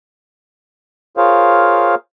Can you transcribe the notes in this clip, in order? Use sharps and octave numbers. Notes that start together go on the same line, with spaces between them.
F4 G#4 A#4 C5 C#5 F5